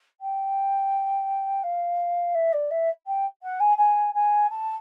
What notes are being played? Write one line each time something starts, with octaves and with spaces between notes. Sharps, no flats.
G5
F5
E5
D5
E5
G5
F#5
G#5
G#5
G#5
A5